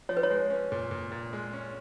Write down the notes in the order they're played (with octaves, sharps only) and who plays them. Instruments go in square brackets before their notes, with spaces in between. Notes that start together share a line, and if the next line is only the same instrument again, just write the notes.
[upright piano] F3 [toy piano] C#5
[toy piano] B4
C#5
[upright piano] G#3
C#4
A#2
A#2
A#2
G#3
C#4